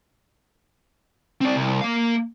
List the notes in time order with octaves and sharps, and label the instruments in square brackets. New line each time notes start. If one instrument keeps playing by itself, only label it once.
[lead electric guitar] C4 D5
C2
A#3 F5